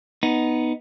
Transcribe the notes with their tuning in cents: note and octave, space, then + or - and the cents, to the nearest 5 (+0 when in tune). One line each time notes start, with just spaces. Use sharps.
B3 +0 D#4 +0